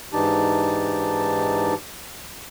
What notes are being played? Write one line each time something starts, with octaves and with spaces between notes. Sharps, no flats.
G#2 E3 D4 D#4 G4 A5